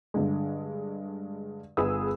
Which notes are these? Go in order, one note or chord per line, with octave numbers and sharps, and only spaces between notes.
G2 D3 G#3
G1 B3 G#4 B5 D#6 E6